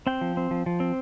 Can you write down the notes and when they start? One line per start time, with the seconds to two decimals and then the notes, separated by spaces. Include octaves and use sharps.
0.07 C4 G5
0.21 F3
0.37 C4
0.51 F3
0.66 F3
0.80 C4